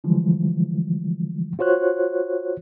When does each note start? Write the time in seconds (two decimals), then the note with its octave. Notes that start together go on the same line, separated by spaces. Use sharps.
0.04 D3 E3 F3 G3 G#3
1.59 F4 F#4 C5 C#5 F#6